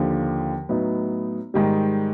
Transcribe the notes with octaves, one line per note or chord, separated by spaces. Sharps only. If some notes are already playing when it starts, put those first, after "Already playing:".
Already playing: D#2 D3 F3
A2 F#3 B3 D#4
G#2 D#3 G3